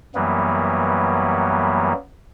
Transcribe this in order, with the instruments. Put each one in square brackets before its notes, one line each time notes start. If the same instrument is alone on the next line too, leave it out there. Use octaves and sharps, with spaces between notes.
[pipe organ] F#2 E3 F#3 G3 A#3 B3